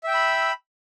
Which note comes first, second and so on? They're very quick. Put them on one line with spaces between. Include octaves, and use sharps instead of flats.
E5 G5 E6 B5